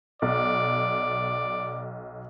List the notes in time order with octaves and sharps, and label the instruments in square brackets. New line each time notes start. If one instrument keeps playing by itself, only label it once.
[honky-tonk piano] B1 [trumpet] D5